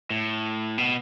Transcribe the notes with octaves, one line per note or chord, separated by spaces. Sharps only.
A2
B2